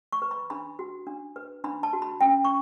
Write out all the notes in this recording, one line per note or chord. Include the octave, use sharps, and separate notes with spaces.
C#6
B4
B5
D4 B5
F#4
D4
B4
D4 B5
A5
F#4
B5
C#4 G5
C#6